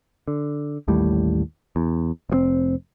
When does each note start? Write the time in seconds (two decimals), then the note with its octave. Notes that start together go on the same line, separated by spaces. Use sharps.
0.28 D3
0.88 A1 D#2 A2 G3
1.76 E2
2.30 F1 B2 C4